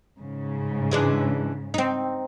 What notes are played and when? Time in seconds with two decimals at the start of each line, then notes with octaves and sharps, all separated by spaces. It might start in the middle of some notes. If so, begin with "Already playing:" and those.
0.18 G#2 C#3
0.91 E3 G#3 D4
1.74 C4 D#4